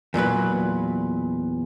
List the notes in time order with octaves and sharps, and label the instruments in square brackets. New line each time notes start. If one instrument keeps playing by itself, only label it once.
[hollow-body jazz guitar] E2 A#2 F#3 B4